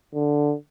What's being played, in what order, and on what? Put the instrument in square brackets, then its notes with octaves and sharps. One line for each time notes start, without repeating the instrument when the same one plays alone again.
[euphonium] D3